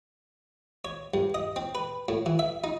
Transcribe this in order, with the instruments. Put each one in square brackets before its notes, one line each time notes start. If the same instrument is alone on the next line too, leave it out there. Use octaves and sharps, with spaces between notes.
[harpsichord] C#5
G2
D#5
C4
B4
A2
E3
E5
D#4